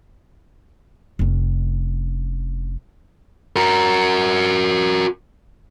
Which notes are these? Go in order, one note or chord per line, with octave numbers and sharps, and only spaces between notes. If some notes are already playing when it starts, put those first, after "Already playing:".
F1 C#4
F#4 A#4